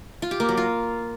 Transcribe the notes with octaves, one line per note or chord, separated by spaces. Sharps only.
F4
G4
A#3
F#3
F4